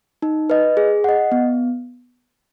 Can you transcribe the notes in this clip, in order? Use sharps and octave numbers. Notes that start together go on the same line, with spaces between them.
D#4
B4 D#5
G#4
D#5 F#5
B3